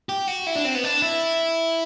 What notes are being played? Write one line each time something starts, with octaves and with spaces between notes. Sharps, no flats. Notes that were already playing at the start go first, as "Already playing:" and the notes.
G4
F#4
E4
D4
C4
B3
D4
E4